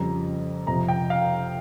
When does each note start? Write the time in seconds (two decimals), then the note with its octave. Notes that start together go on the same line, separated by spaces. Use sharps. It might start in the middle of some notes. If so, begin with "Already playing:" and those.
Already playing: F2 C#3 G3 A#5
0.67 F2 C3 F3 A#5
0.88 G5
1.10 F5